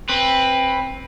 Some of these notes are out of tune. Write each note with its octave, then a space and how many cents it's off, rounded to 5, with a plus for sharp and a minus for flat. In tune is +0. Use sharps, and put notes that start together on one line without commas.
C4 +15 B4 +0